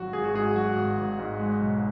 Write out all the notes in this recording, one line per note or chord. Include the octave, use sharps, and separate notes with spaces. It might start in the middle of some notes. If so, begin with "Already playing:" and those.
Already playing: G#1 F#3 F#4
G#1 G#4
F#4
G#2 G#4
F#3 F#4
G#1
G#1
G#2
G#3
B1